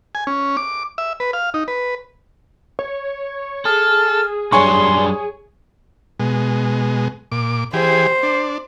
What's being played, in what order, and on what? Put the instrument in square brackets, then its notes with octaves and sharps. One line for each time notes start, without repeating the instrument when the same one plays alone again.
[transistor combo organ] G#5
C#4
D6
E5
B4
F5
D#4
B4
[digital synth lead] C#5
[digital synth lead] G#4 [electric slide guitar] A4 [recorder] F6
[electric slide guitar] F#2 G3 D4 [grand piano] C#5 G#5 C#6 [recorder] C6
[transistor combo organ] B2 G#3
A#2 D6
[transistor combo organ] E3 G4 G#4 [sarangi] C5
[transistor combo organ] D4